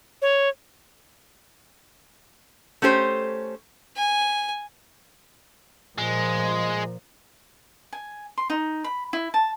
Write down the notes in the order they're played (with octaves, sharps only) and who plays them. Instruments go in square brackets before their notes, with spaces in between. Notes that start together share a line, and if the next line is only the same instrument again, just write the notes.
[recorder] C#5
[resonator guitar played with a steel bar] A3 C#4 G4 C5
[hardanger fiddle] G#5
[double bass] A#2 F3 [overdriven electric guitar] G#3
[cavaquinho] G#5
C6
D#4
B5
E4
A5